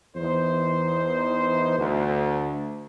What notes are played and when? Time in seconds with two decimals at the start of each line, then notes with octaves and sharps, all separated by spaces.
0.16 E2 D#4 C5
1.78 D2